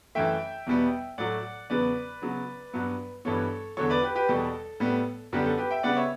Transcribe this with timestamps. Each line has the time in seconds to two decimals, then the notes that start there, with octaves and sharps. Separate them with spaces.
0.15 F#2 E3 A3 E5 G5
0.67 E2 B2 G3 B3
1.18 A2 F#3 A3 D5 F#5
1.70 E2 C#3 F#3 B3 B4 D5
2.22 C#3 F#3 B3
2.74 G2 F#3 B3
3.25 G2 E3 B3 A4 C#5
3.77 E2 D3 F#3 A4 C#5
3.90 B4 D5
4.03 G4 B4
4.15 G4 B4
4.28 E2 B2 G3 A4
4.80 A2 G3 B3
5.33 F#2 D3 G3 B3 G4
5.45 A4
5.58 G4 B4
5.71 E5 G5
5.83 C#3 G3 B3 D5 F#5
5.97 C#5 E5